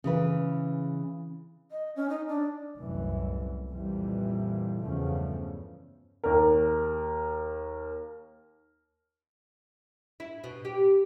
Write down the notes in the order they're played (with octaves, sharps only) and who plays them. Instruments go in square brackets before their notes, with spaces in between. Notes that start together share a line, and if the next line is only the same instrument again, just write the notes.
[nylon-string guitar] C#3 E3 B4
[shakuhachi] D#5
C#4
D#4
D4
[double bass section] F1 C2 F#2 A2 E3
F2 A#2 E3 G3
E2 G2 C#3 F3 A3 C#4
[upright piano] D#2 A#4
[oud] E4
B2
G4